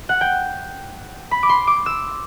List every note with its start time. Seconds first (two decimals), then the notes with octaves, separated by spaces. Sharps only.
0.09 F#5
0.21 G5
1.31 B5
1.43 D6
1.49 C6
1.67 D6
1.86 E6